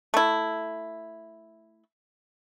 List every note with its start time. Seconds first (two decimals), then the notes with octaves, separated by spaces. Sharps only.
0.14 A3 E4